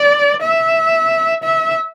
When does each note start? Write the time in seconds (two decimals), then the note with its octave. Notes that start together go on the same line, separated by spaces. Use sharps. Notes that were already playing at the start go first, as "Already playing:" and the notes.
Already playing: D5
0.42 E5
1.44 E5